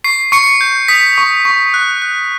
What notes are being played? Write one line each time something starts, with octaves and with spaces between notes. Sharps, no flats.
C#6 C7
C#6 C#7
G6
D#6 B6
C#6
C#6
F#6
F#6